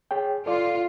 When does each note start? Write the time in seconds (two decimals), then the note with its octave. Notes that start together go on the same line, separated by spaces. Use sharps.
0.11 G#4 C#5 G5
0.46 F4 A4 D5